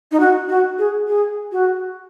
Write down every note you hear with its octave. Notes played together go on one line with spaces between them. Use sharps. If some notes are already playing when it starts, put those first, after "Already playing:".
D#4
F#4
F#4
G#4
G#4
F#4